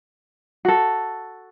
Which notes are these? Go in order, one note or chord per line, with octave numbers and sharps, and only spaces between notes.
F#4 A4